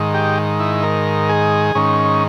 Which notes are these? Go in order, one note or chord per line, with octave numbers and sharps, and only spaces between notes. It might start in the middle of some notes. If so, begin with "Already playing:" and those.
Already playing: G#2 D#3
G4
E4
A#4
G#4
G#2 D#3 C#4